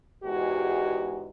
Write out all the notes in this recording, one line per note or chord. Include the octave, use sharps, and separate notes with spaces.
E2 G#2 G#3 F#4 G4